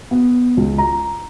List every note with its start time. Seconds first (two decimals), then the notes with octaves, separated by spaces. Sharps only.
0.11 B3
0.57 C#2
0.78 A#5